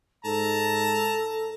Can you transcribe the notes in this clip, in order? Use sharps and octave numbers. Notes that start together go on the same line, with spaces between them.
G#2 A4 A5 A#5